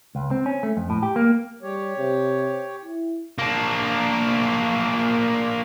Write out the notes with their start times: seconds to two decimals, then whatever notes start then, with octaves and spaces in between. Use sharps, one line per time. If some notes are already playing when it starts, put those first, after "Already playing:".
0.15 C#2
0.31 C4
0.46 C#4
0.63 A3
0.77 F2
0.90 A2
1.03 G4
1.16 A#3
1.62 G3 G4 C#5
1.97 C3
2.84 E4
3.38 A#3 D4